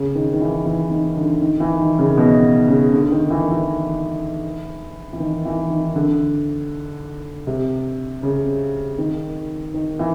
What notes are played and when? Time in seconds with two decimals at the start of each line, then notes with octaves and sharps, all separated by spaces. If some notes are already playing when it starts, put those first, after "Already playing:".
Already playing: C#3
0.15 D#3
0.33 D#3
0.41 E3
0.66 E3
0.91 D#3
1.17 D3
1.41 D#3
1.60 E3
1.80 D#3
1.99 C#3
2.17 B2
2.68 C#3
2.93 D3
3.12 D#3
3.30 E3
3.50 E3
5.13 E3
5.20 D#3
5.45 E3
5.70 D#3
5.96 D3
7.47 C3
8.23 C#3
8.98 D#3
9.74 D#3
9.99 E3